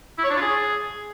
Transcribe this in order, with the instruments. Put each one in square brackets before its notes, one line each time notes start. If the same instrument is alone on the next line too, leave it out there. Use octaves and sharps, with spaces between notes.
[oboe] E4
C#5
D4
F4
G#4